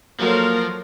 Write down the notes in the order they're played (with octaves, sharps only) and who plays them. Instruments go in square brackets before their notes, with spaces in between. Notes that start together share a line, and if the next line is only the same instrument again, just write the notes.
[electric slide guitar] F3 [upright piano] F#3 F#4 C#5 [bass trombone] A#3 [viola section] A4 A#4 C5